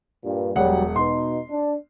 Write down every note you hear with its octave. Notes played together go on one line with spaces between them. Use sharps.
G2 A#2
E1 F#3 G3 F#5
B2 D#4 C6
D4